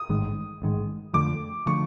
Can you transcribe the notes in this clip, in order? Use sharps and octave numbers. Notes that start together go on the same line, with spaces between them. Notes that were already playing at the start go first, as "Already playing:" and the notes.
Already playing: D#6
A1 G#2 D#3 G#3
A1 G#2 D#3 G#3
F2 D3 F3 A3 D6
D3 F3 A3 C#6